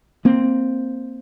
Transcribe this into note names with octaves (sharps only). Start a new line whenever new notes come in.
A#3 C4